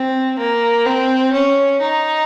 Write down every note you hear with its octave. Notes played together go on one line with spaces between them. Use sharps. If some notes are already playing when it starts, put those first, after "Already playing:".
Already playing: C4
A#3
C4
C#4
D#4